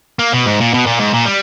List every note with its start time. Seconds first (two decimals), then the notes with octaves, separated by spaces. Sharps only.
0.19 A#3
0.33 B2
0.46 G#2
0.60 A#2
0.74 B2
0.87 A#2
0.99 G#2
1.14 A#2
1.26 G3